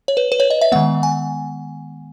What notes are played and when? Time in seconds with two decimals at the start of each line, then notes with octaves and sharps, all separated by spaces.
0.08 C#5
0.17 B4
0.32 B4
0.40 C#5
0.50 D#5
0.61 E5
0.72 D#3 G#3 B3 F#5
1.03 G#5